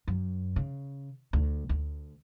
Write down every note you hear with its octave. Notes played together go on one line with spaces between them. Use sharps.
F#2
C#3
D2
D2